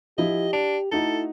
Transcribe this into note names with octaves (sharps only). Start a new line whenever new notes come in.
F3 E4 G4 D#5
D4 F7
A3 D#4 E4 F#4 A4